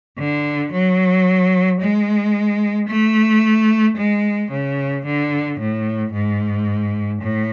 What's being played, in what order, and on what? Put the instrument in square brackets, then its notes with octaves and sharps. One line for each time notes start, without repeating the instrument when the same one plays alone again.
[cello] D3
F#3
G#3
A3
G#3
C#3
D3
A2
G#2
A2